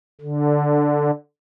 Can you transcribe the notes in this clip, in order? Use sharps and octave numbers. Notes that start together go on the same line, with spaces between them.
D3